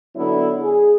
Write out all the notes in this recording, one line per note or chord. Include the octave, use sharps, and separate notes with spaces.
D3 F#3 B3 D4 E4
G#4